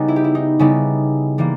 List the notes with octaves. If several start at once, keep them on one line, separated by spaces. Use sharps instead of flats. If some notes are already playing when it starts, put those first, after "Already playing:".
Already playing: C#3 G3 B3 D#4
E4
G4
E4
D#4
C#3 G3 B3 D#4 E4
E3 G3 A#3